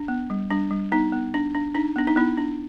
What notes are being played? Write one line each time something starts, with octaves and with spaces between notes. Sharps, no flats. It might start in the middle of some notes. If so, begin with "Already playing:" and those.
Already playing: D4
B3
G3
G3 D4
G3
B3 D#4
B3
D4
D4
D4 D#4
B3 D4
D#4
B3 E4
D4